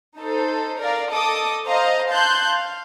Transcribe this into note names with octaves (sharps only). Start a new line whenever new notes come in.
D#4 A4 C5
A#4 D5 F5
A4 D#5 D6 D#6
C5 D#5 F5 A#5
F5 A5 C6 F#6 G6
F5